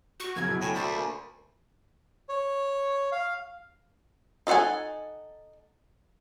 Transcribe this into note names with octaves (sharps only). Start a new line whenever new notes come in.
F#4 C#6
F#2 C#3 A#4 G#6
B1 B2 E4
A2 G5 G#5
D2 E5 B5 G6 A6 C7
A#3 G#5
C#5
F5
D#4 A4 C5 F#5 G#5